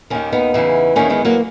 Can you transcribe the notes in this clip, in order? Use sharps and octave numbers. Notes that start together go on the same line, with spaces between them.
D#2 D#3 A#3 C#4
B3 D#4
E2 C#3 E3
E2 D#3 A#3 C#4
G#3 B3
F#3 A#3